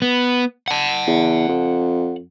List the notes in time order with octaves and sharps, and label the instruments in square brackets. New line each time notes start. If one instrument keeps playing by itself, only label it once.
[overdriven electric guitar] B3
F#5 A5
[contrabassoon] E2
F2